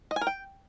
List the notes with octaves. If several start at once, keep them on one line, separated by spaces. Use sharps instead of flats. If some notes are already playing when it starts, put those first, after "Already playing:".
D#5
G#5
A#4
G5